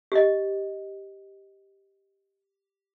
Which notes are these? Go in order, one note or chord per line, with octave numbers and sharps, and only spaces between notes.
G4 D#5